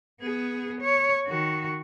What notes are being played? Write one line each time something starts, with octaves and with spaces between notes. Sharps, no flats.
B3 G#4
C#5
D#3 F#4